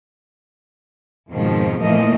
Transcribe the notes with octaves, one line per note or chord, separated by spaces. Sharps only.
F2 G#2 B2 D#3 F3
A#2 E3 F3 A3 A#3 D#5